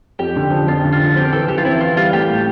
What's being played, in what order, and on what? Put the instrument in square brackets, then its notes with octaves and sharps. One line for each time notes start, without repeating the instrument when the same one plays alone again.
[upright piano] F2 [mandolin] G4
[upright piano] D3
F3
[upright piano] F2 [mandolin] F4
[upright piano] D3
[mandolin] F4
[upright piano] F3
[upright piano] C4 [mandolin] G4
[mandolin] A#4
[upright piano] E3 [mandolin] A4
[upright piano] E3 [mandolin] G4
[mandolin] F4
[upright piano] C4 [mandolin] E4
[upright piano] E3 [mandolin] F4
[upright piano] G3 [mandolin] F4
[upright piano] A3 [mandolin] G4
[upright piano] A2